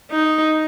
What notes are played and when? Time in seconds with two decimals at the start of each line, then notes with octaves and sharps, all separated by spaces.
0.11 D#4